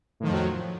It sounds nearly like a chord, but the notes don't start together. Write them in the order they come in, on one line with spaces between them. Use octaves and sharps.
A2 D#3 F3 F2 F#3